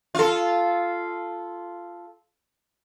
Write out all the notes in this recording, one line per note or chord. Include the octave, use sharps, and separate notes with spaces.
F4 A4